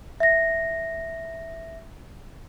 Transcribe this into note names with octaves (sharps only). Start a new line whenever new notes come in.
E5 A#6